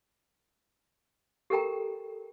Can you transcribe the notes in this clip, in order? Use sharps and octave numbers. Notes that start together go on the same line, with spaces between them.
G4 A4 A#4 G5 A#5